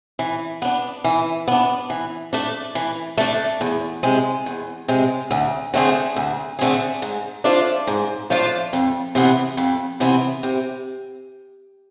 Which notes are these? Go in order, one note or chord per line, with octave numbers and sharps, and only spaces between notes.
E3
B3 D4
E3
B3 D4
E3
A3 D4
E3
A3 D4
E2
C3 G#3
E2
C3 G#3
D2
D3 A3 C4 G#4
D2
D3 A3 C4 G#4
G#2
F3 A3 D4 F4
G#2
F3 A3 D4 F4
F2
C3 E3 B3
F2
C3 E3 B3
C3